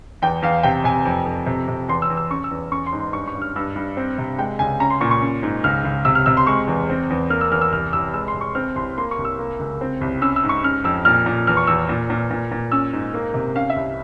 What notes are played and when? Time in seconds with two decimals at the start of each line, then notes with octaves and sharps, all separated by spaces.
0.22 E2 G5
0.42 E2 F5
0.63 C3 G5
0.84 C3 G#5
1.05 F2
1.26 F2
1.46 C3
1.68 C3
1.88 E2 C6
2.02 E6
2.10 E2
2.17 E6
2.31 C#4 C#6
2.44 E6
2.51 E2
2.72 C#4 C#6
2.86 C6
2.93 G#2
3.00 C6
3.13 G2 C#6
3.27 C#6
3.35 G2
3.42 F6
3.56 G2 E6
3.76 G2
3.97 C4
4.18 C3
4.38 G#3 G5
4.59 C#2 G#5
4.80 C#4 A#5
4.90 C6
5.01 A#2 C#6
5.11 C#6
5.22 C#4
5.43 G#2
5.64 C#2 F6
5.85 C#2
6.05 C3 E6
6.15 F6
6.26 C3 E6
6.37 C6
6.47 G#3 C#6
6.67 E2
6.89 C4
7.10 E2
7.30 A#3 F6
7.41 E6
7.51 E2 F6
7.62 E6
7.72 C2 F6
7.93 C2 E6
8.14 G#3 E6
8.28 C6
8.34 C2
8.41 C#6
8.55 C4 F6
8.76 C2 C6
8.98 A#3 C6
9.11 C#6
9.19 C2
9.25 E6
9.39 A#3
9.59 C#2
9.81 C4
10.01 C2
10.22 C#4 E6
10.36 E6
10.43 G#2
10.49 C#6
10.63 C#4 F6
10.84 F2 E6
11.05 A#2 F6
11.26 A#2
11.47 E2 F6
11.57 C#6
11.67 E2 E6
11.89 A#2
12.10 A#2
12.31 A#2
12.52 A#2
12.72 C#4 E6
12.93 G#2
13.14 A#3
13.34 C3
13.56 C#4 F5
13.70 E5
13.76 C2